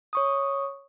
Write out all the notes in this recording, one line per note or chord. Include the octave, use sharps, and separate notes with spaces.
C#5 C#6 D#6